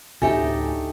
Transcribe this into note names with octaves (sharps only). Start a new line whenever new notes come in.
D2 A2 D#4 G4 A4 E5 G#5